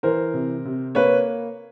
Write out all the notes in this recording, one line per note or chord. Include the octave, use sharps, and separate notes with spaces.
E3 A#4 C5
C3
C3
A#3 B4 C#5